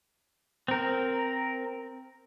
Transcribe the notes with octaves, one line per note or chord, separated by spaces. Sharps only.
C4 A#4